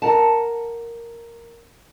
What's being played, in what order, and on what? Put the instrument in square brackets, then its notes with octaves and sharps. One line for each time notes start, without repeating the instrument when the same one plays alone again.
[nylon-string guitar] A#4 F#5 A5